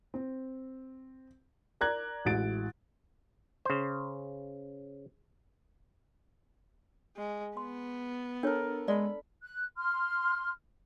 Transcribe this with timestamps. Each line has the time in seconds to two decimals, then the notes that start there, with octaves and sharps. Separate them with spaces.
0.14 C4
1.81 A#4 D5 A#5 F#6 G#6
2.25 A1 G#3 E4 F#4 A6 D7
3.65 C#3 C5
7.17 G#3
7.57 B3 C6
8.43 D4 A4 A#4 C#5
8.88 G#3 D5 B5
9.43 F#6
9.78 C6 F6